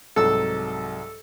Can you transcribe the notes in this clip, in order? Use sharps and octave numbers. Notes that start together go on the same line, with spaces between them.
C2 G#2 F#3 A4 E6